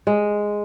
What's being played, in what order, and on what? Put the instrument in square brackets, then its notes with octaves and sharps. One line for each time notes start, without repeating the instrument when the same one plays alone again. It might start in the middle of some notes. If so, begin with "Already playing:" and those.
[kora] G#3